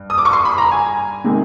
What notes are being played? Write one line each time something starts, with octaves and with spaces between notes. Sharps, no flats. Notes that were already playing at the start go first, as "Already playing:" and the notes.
Already playing: G2
D#6
D6
C#6
C6
B5
A#5
G#5
C3 D#3 G#3